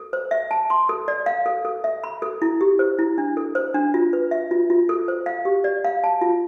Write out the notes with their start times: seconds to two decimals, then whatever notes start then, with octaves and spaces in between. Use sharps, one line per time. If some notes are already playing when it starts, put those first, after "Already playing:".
Already playing: A4
0.13 C5
0.31 E5
0.51 A5
0.70 C6
0.89 A4
1.08 D5
1.26 F5
1.46 A4
1.65 A4
1.84 E5
2.04 B5
2.22 A4
2.42 E4
2.61 G4
2.79 C5
2.99 E4
3.18 D4
3.37 A4
3.55 C5
3.74 D4
3.94 F4
4.13 B4
4.31 E5
4.51 F4
4.70 F4
4.89 A4
5.08 C5
5.26 F5
5.45 G4
5.64 D5
5.84 F5
6.04 A5
6.21 F4